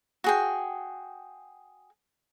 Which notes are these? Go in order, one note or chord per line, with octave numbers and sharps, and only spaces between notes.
F#4 G#4 G5